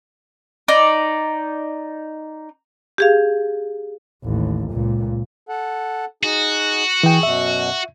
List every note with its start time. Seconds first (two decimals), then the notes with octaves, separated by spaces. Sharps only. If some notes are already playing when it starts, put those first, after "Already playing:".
0.68 D#4 D5
2.98 G4 G#4 F5
4.24 A1 D#2
4.71 C#2 A#2
5.49 A4 F#5
6.23 D#4 F#4 G#4
7.03 E3 G#4 G5
7.23 F#2 B2 E5